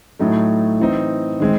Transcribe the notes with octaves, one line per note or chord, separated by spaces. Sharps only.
A2 F#3 A3 D#4
E3 C4 D#4
D#3 G#3 C4